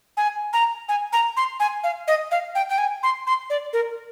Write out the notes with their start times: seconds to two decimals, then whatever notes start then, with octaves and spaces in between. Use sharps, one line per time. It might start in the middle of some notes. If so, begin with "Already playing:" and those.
0.17 G#5
0.53 A#5
0.89 G#5
1.13 A#5
1.37 C6
1.60 G#5
1.84 F5
2.08 D#5
2.31 F5
2.55 G5
2.69 G5
2.78 G#5
3.03 C6
3.27 C6
3.50 D5
3.73 A#4